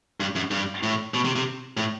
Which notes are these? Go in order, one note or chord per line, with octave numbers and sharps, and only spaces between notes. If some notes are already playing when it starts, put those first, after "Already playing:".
G2
F#2
G2
A2
B2
C3
C3
A2